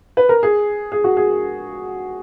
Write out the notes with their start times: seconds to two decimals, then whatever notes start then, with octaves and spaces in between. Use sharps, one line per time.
0.17 B4
0.29 A#4
0.43 G#4
0.92 G#4
1.04 F#4
1.17 G#4